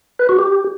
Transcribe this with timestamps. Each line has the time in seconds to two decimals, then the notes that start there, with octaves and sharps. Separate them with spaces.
0.19 B4
0.29 F#4
0.39 G4